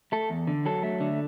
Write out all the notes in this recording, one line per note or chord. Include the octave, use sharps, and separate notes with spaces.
A3 A4
E2
D3
F#3 A4
A3
D3